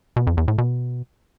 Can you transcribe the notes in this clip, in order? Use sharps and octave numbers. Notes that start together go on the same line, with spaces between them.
B2
F2
E2
A2
B2